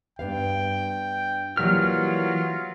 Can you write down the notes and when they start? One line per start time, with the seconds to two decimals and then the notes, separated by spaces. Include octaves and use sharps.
0.19 G2 B3 F5 G5
1.57 E3 F#3 G3 A#3 F4 F6